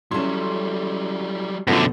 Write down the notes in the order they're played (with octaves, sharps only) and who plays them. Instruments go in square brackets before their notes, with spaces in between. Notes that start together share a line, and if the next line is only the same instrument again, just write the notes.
[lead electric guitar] F#3 G3 [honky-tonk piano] C#4 C6 [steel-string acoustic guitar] E4 A4
[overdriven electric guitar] F#2 D3 [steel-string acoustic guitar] B2 [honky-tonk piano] F3 A3 B3